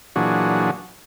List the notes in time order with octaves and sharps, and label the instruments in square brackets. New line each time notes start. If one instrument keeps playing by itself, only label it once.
[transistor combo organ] A#2 E3 F#3 D4 F#4 G#4